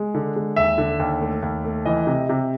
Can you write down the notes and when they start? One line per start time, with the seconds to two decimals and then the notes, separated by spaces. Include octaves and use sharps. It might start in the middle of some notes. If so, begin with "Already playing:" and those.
Already playing: G#3
0.14 D3
0.36 G#3
0.56 D#2 E5
0.78 D3
0.99 D#2
1.21 A3
1.42 D#2
1.64 A3
1.85 E3 D#5
2.07 C3
2.29 C3